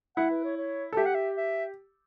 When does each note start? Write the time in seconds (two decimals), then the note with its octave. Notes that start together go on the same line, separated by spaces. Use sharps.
0.17 E4 F#5
0.31 B4
0.44 C#5
0.57 C#5
0.93 A4
0.97 G4 E5
1.06 F#5
1.15 E5
1.37 E5